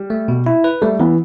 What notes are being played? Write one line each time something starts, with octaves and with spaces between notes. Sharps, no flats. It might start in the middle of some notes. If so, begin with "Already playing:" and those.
Already playing: G3
A3
B2
E4
B4
G3 A3
E3 B3